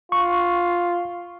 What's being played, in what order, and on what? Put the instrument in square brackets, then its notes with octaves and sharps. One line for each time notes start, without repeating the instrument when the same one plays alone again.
[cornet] F4 [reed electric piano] C#6